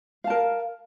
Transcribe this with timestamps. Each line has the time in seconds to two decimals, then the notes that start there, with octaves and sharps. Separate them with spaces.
0.24 F5
0.27 A5
0.30 A#4